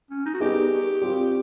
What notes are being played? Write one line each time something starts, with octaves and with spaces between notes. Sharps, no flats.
C#4
D#4
F#4
G3 B3 D#4 G4 G#4
G3 C4 F4